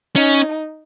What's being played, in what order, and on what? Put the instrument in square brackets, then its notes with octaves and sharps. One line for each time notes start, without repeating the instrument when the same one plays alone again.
[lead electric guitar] C#4 [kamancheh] D#4